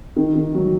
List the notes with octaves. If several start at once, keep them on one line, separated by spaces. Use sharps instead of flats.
D#3
D#3
F#3